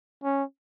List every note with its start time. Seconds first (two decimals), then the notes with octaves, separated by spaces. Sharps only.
0.24 C#4